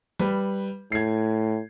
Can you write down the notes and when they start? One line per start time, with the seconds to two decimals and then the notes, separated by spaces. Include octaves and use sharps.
0.19 G3 B4
0.92 A2 G#6 C7